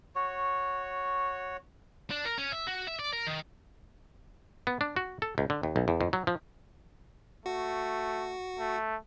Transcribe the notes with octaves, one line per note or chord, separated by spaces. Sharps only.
F#4 C#5
D4
A#4
C#4
E5
F#4
E5
D5
A#4
D#3
B3
D4
F#4
A4
C#2
D3
D#2
B1
E2
F2
F#3
F3
A3 F#4
A3